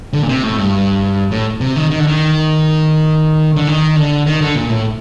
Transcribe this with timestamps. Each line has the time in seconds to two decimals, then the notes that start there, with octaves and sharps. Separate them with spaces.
0.13 D3
0.22 A#2
0.29 C3
0.43 A2
0.58 G2
1.31 A2
1.61 C3
1.76 D#3
1.91 D#3
1.99 D3
2.07 D#3
3.56 D3
3.67 D#3
3.96 D3
4.26 D#3
4.41 D3
4.55 A#2
4.69 A2